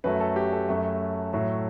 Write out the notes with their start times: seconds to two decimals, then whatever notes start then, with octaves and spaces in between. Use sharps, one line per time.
0.04 F#2 F#3 A3 B4
0.20 A4
0.36 G4
0.53 A4
0.68 F#2 F#3 A3
1.33 A2 F#3 A3